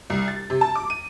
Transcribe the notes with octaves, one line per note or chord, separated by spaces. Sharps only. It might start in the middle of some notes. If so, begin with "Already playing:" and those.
C2
A6
C3
A5
D6
D#7